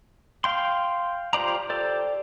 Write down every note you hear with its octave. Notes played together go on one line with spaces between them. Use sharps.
F5 G5 C6
F4 G4 C5 D5 A#5
G4 A4 C5 D5